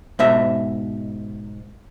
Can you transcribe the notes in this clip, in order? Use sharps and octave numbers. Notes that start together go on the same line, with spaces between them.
G#2 B2 E5